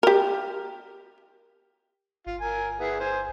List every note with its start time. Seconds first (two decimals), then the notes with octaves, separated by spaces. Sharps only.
0.03 G4 A#4
2.27 G1 F4
2.41 A#4 G#5
2.80 B3 E4 G#4
3.00 C5 G#5